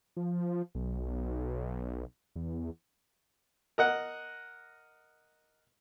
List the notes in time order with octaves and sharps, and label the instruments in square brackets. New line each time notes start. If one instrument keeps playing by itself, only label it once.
[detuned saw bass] F3
B1
E2
[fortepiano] A#4 D#5 F#5